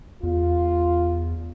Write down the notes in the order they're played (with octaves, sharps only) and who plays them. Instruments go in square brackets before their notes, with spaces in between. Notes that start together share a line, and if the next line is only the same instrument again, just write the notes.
[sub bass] E2 [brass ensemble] F4